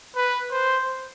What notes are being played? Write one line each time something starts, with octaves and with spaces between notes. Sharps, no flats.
B4
C5